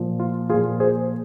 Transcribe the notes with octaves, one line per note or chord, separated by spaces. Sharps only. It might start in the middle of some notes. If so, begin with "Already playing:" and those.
Already playing: A#2 F3
F4
A#2 F3 F4 G#4
G#4 C5